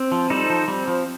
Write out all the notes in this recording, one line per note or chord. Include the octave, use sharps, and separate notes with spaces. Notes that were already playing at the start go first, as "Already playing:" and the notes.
Already playing: C4
F3
G3 D#4 A4 C5
F3
G3 C4
F3